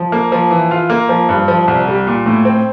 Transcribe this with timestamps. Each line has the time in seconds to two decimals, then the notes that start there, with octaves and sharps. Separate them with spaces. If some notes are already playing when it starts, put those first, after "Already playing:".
Already playing: F3
0.12 A#3
0.32 F3
0.51 E3
0.71 F4
0.90 A#3
1.09 F3
1.29 G2
1.48 F3
1.68 C2
1.87 G3
2.07 A#2
2.26 A2
2.45 C4